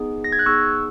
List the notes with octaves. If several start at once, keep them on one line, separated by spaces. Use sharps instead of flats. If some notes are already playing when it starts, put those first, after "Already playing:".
Already playing: B3 D#4 G#4
A#6
G#6
F#6
B3 D#4 G#4 C#6 E6